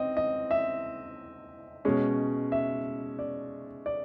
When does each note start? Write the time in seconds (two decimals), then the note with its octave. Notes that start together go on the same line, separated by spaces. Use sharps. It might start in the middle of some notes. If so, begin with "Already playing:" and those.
Already playing: C4 D#5
0.17 D#5
0.51 E5
1.85 B2 G#3 C#4
2.52 E5
3.19 D5
3.86 D5